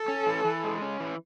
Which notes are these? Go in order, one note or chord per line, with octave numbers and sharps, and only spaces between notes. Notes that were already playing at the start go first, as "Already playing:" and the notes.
Already playing: A4
C#4
E3
E3
G#3
C#4
E3